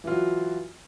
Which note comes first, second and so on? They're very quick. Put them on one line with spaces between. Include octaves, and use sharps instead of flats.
E3 F4 F#3